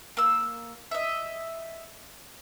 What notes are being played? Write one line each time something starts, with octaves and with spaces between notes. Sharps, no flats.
A#3 E6
D#5 E5